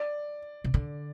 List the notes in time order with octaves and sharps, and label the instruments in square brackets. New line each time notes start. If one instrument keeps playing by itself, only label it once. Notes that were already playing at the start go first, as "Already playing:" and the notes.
Already playing: [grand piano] D5
[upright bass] C3
D3